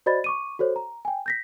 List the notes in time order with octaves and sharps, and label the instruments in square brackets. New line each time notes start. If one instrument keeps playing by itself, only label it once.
[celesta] F#4 C5 D5 D#5 B5 A6
C#6 D6 D#7
F#4 A4 C5 C#5
A#5
G5 G#5
G6 A#6 B6